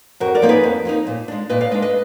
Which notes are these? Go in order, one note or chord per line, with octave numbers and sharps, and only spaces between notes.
F2 F#4 A#4
A#4 D5
F3 A#3 D#4
G#4 B4
F2
F3 A#3 D#4
A#2
G#3 D4
A#2 B4 D#5
D5 F5
G#3 D4 B4 D#5
B4 D#5